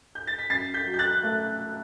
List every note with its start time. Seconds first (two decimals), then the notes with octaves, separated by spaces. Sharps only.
0.15 G6
0.27 A6
0.39 B6
0.50 F#2 A6 C7
0.74 G6 B6
0.86 F#3
0.94 G6
0.99 F#6 A6
1.23 A3